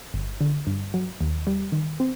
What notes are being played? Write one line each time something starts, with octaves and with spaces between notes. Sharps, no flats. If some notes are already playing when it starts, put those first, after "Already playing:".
G1
D3
G2
F#3
D#2
G3
D#3
C4